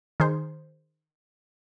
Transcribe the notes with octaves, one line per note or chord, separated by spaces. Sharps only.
D#3 G#4 C5